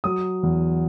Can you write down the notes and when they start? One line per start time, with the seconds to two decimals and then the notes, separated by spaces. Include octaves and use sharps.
0.04 F#3 D#6
0.43 E2